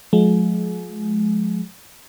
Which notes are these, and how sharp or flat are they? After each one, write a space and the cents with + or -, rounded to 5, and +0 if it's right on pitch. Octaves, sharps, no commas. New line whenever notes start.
F3 +40 G#3 +35